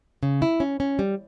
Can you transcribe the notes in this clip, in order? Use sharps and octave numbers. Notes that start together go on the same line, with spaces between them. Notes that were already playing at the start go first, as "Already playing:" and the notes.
C#3
E4
C#4
C#4
G3